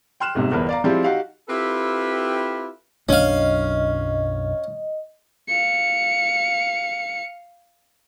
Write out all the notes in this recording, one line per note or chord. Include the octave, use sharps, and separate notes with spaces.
G5 C6 F6 F#6 E7
G1 G#2 C3
G1 E2 A#4 B4
D5 F5 A#5
F3 G3 G#3 C4 E4 G4
D#4 F#4 G4 F5
C4 E4 F4 G4 A4 B4
B1 F#2 C#4 D4 D#5 F5
F5 C#7